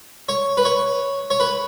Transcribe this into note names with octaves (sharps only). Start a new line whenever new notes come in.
C#5
B4
C#5
C#5
B4